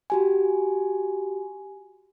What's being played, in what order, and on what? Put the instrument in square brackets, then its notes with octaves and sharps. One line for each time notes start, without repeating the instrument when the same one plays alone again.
[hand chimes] F#4 G4 G#5